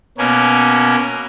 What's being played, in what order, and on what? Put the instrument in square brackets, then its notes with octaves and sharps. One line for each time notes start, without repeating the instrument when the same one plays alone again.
[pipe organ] B2 A#3 C#4